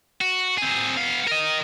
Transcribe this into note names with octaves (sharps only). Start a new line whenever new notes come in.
F#4
C4 G#4
B3 F5
A#4 D#5